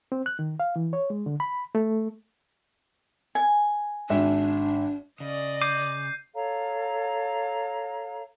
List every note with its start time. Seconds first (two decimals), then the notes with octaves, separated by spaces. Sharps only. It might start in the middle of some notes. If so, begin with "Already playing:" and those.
0.12 C4
0.26 F#6
0.39 D#3
0.60 F5
0.76 E3
0.93 C#5
1.10 G#3
1.26 D3
1.40 B5
1.75 A3
3.35 G#5
4.10 G#1 D4 E5
5.20 C#3 D5 D#5
5.62 D6 G6 C7 D#7
6.35 A4 C#5 F5 A#5